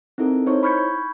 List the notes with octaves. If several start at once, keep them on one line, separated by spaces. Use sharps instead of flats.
C4 D#4 E4 A4 A#4
D#4 E4 C5 C#5 C#6
B5 C#6 F6 G6 G#6 C#7